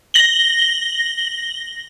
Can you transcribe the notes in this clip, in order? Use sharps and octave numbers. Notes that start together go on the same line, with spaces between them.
A#6 F#7 G7